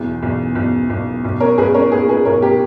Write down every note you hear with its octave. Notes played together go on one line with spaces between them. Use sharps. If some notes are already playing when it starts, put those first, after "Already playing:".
Already playing: B1 E2
B1
B1
B1
B1
A#4 C#5
B1 G#4 B4
A#4 C#5
A#2 G#4 B4
G#4 B4
B1 A#4 C#5
G4 A#4